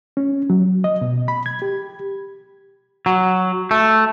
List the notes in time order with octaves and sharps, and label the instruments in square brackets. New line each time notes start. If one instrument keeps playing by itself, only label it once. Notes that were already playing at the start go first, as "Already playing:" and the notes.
[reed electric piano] C#4
F#3
D#5
B2
B5
G#6
G4
[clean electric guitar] F#3
A3